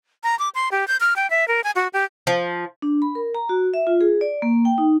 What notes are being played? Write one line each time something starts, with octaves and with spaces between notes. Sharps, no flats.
A#5
D6
C6
G4
G6
F6
G5
E5
A#4
G#5
F#4
G4
F3
D4
B5
A#4
A#5
F#4
E5
F4
G#4
D5
A#3
G5
D#4